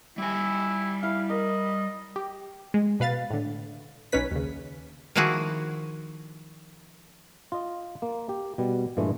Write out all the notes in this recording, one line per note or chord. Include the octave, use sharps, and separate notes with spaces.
G3 E4 G#5
E4 F5
A#4 D#5
G4
G#3
B2 B4 F5 A6
A2 D3
B1 C#4 D#4 B4 B6
D#2 C#3
D#3 F3 A#3 E4 F#4 G#4
F4 D#5
A#3
G4
B2 G3
G2 A#2 E3 G#3 A3